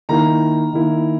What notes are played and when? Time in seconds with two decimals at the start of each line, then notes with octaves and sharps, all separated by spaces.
0.09 D#3 A#3 E4 A#5
0.73 D#3 A#3 E4